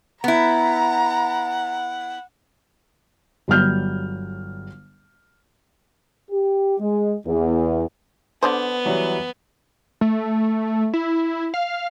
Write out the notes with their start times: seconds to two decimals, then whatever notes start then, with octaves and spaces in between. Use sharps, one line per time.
0.24 B3 E4 F#5 A#5
3.48 G1 F#3 G3 F6 G6
6.31 G4
6.78 G#3
7.26 E2
8.43 D3 B3 D4 C5
8.85 E3 F#3 G3
10.01 A3
10.94 E4
11.54 F5